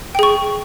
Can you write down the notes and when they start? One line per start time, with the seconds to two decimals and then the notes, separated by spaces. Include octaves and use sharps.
0.15 G5
0.19 G#4
0.23 C#6